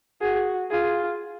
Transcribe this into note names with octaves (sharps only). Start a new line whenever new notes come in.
F#4 G#4
F4 G#4